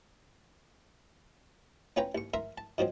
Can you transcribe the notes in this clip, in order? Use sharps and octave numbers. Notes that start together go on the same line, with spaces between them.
C#4 F4 B4 C#5 G5 A#5
D#2 C#6
A#4 E5 A#5 C6
A5
D#3 F3 F#3 C4